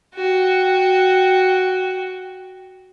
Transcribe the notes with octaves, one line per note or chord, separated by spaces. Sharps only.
F#4 G5